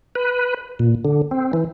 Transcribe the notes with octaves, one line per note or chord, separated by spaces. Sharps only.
B4
A#2
D3
C4
E3